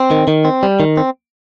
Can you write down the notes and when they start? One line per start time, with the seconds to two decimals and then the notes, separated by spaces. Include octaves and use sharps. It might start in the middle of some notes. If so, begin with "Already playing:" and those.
Already playing: C4
0.11 D#3
0.28 D#3
0.45 C4
0.63 G3
0.80 D#3
0.97 C4